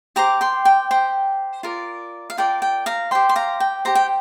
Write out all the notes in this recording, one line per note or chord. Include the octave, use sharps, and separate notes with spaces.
G4 C5 A#5 D6
G5 C6
G5
G4 C5 G5
F4 A#4 D5
F5
F4 A#4 D5 G5
G5
F5 A#5
G4 C5 G5 C6
C6
F5 A#5
G5
G4 C5 A#5
G5